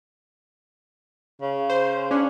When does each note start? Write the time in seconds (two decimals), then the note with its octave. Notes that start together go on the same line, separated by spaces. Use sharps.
1.41 C#3
1.70 C5
2.11 C#4 D4